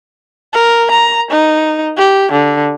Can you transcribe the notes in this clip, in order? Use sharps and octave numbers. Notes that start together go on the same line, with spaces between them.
A#4
A#5
D#4
G4
D3